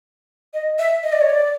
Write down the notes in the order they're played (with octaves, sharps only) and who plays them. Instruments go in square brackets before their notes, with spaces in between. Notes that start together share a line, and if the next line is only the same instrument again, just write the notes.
[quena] D#5
E5
D#5
D5
C#5
D5